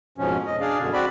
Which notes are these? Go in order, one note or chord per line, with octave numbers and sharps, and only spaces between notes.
F2 G#2 B2 F3 C#4
D#5
D4 G#4 D5 F5
F#2 B2 D3
C4 F#4 D5 B5